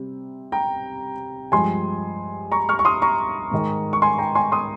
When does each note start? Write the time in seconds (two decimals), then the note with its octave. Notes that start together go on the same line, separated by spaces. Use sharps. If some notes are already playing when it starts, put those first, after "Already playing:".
Already playing: C3 G3 C4
0.52 G5 A#5
1.52 G2 F3 G#3 G#5 C6
2.52 A#5 C#6
2.69 C#6 F6
2.79 C#6
2.85 C6 D#6
3.02 A#5 C#6
3.51 G#2 D#3 G#3
3.93 C#6
4.02 G#5 C6
4.18 G5 A#5
4.35 G#5 C6
4.52 C6 D#6